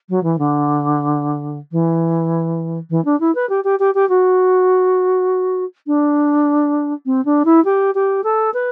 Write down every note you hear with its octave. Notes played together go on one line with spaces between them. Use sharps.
F#3
E3
D3
E3
E3
D4
E4
B4
G4
G4
G4
G4
F#4
D4
C4
D4
E4
G4
G4
A4
B4